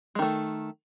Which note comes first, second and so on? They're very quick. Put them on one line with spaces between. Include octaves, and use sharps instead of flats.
G#3 D#3 A3